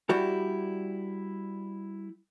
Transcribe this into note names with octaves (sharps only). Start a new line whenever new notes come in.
G3 E4 F#4 G4